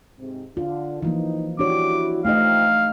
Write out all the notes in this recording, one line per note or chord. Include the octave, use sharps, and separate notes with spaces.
G#2 C3
D3 F4
E3 F3 A#3 D#4
D4 E4 F#4 G4 C#5 D6
A3 D#4 F4 C5 D#5 F5 G5